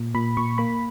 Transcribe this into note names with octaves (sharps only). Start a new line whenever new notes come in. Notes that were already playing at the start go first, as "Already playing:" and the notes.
Already playing: A#2
A#2 B5
A#2 C#6
A#3 B5